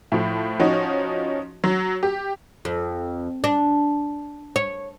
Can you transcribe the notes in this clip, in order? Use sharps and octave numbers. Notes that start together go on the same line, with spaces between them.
A2 F3
F3 C#4 D#4 F#4
F#3
G4
F2
D4
C#5